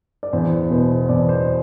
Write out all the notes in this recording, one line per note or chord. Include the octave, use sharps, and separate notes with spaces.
D5
E2 C5
B2 B3 C5
C5
E2 D5
C5